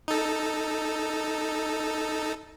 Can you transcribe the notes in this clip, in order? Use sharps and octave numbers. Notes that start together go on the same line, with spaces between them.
D#4 A4